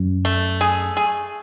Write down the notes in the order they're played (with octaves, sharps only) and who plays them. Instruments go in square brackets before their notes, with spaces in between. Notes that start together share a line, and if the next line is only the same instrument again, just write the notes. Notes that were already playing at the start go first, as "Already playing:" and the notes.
Already playing: [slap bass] F#2
[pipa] A3
G#4
G#4